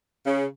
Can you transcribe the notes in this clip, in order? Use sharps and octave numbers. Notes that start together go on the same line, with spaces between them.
C#3